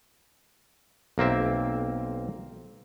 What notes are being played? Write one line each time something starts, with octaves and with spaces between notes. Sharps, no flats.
B1 A#3 C4 E5